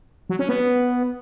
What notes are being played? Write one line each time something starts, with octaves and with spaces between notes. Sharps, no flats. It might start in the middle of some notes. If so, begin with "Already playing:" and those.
F#3
C#4
B3